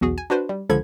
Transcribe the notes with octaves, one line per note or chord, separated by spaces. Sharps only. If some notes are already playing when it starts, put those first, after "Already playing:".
B1 E2 F#4 G#4
G#5
D4 F#4 B4 C5
G3
C#2 D3 F3 A4 B5 G#6